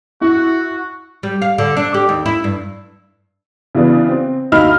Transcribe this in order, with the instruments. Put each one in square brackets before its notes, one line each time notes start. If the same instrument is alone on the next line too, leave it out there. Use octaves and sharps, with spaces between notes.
[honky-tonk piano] E4 [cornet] F#4
[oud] G3
F5
D3
D4
G4
D#2
E4
G2
[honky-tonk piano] C#3 E3 B3 D4
C4
D2 D#4 F5 B5 F6